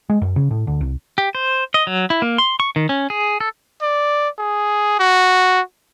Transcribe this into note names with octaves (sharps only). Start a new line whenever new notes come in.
G#3
F#2
C#3
A2
D2
C2
G4
C5
D#5
F#3
E4
A#3
C6
C#6
D#3
C#4
G#4
A4
D5
G#4
F#4